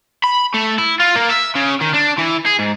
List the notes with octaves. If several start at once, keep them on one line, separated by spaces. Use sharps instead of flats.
B5
A3
E4
F4
A#3
E5
C#3
D#3
D4
E3
G#4
G#2